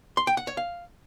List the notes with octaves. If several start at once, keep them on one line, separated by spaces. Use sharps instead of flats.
C6
G5
F#5
C#5
F5